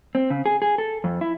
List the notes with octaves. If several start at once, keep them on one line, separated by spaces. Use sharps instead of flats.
C4
C#3
G#4
G#4
A4
F2
E4